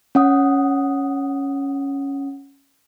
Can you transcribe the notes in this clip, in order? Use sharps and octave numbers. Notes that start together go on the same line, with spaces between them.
C#4 F#5 D#6